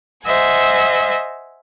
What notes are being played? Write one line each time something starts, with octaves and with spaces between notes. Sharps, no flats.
C5 D#5 E5 F#5 G#5